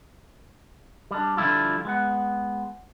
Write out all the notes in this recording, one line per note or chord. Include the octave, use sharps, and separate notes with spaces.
G3 D4
D3 F3 G3 E4 F4
G#3 B3 F#5